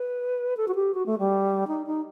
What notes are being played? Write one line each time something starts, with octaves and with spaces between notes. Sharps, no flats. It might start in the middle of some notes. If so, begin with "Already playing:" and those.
Already playing: B4
A4
F#4
G4
F#4
A3
G3
D#4
D#4